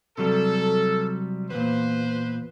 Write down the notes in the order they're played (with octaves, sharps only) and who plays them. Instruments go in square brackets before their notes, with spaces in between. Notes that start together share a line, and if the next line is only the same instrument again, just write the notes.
[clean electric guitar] C3 F#3 G3 [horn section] A4
[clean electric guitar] E2 A#2 [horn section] B4 C5